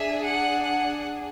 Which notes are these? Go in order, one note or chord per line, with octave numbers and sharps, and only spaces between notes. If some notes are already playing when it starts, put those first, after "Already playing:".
Already playing: D4 G#4 E5
F#5
F#5